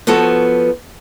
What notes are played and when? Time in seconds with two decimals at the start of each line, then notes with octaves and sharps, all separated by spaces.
0.07 F3 B3 F#4 A4 B4 C#5